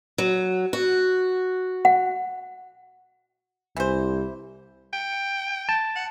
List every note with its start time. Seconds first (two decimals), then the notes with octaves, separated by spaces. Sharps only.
0.18 F#3
0.73 F#4
1.85 F#5
3.77 C2 E3 C5
4.93 G5
5.69 A5
5.96 F#5